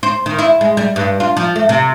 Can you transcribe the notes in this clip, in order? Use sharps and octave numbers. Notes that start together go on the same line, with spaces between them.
C5
D#3
E4
G#3
G3
G2
F4
F3
A3
C3